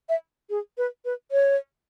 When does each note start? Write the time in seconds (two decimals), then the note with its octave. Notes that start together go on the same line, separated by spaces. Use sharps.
0.09 E5
0.50 G#4
0.78 B4
1.05 B4
1.31 C#5